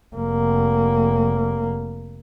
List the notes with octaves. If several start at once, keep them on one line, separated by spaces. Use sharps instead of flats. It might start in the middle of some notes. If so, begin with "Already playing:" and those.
F1 A#3